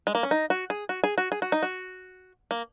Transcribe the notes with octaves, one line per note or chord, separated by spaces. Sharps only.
G#3
A#3
C#4
D#4
F#4
G#4
F#4
G#4
F#4
G#4
F#4
D#4
F#4
A#3